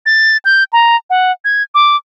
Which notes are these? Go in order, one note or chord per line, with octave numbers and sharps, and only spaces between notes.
A6
G6
A#5
F#5
G#6
D6